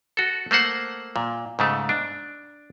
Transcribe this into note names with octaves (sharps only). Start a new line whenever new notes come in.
F#4 A4
A3 A#3 C5 F#5
A#2
G#2 C#3 A3
D4